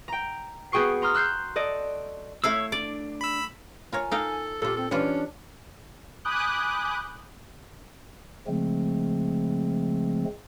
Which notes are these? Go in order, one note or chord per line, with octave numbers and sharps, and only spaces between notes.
G5 A#5
B3 F#4 G#4 G5 C#6 C7
A#5 C6 D#6 F6
E6 F#6 G6 C7
A4 D5 D#5
A3 E4 C#5 F5 E6
D4 D5
B5 E6
F4 A#4 C#5 G#5
D#4 A4 F5 G5
A#2 F4 G4 A4
C4 A4
E3 G3 C#4 D4 F4
G#5 B5 D6 D#6 F#6 G6
C#3 F3 G#3 A3 C4